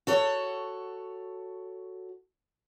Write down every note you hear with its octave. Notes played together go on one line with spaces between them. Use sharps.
F#4 A4 C#5